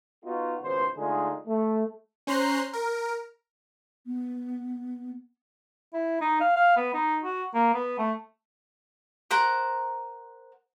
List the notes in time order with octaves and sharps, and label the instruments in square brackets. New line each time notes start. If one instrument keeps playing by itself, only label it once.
[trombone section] B3 D#4 F4 F#4
G#1 C#2 B3 C5
D3 G#3 A3 D#4 F4 G#4
A3
[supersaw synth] C#4 C5 A#5 C6 F#6 C7
A#4
[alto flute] B3
[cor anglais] E4
D#4
F5
F5
B3
D#4
F#4
A#3
B3
A3
[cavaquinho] A#4 C5 F#5 A#5